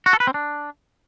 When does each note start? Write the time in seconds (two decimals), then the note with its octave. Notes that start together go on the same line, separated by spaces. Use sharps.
0.06 F#4
0.13 A4
0.20 B4
0.27 C4
0.34 D4